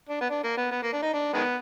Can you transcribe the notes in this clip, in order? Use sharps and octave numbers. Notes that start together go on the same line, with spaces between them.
D4
B3
D4
A#3
B3
B3
A#3
D4
D#4
D4
D#3 G#3 B3